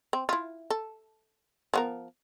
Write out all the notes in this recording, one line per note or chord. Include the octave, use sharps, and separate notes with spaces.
C4
E4 F4
A4
F3 B3 A#4